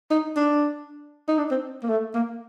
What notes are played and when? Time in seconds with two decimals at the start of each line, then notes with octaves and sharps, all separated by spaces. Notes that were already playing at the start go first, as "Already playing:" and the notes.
0.11 D#4
0.36 D4
1.28 D#4
1.38 D4
1.51 C4
1.83 A#3
1.89 A3
2.14 A#3